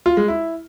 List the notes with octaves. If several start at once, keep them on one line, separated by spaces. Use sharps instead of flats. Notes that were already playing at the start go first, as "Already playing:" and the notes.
F4
G#3
E4